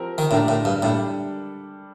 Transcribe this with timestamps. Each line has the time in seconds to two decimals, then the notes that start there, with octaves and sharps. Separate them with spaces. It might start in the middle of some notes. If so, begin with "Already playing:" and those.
Already playing: F3 C4 G4 A#4
0.18 D#3
0.31 A2 D3 A3 D4 G4 A#4
0.48 A2
0.65 G2
0.82 A2 G3 D4 A4